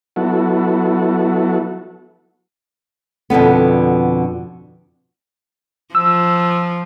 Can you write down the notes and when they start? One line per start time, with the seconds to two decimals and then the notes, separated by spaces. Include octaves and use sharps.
0.16 F#3 B3 E4 F#4 A4
3.30 F2 B2 D3 B3
5.95 F3 E6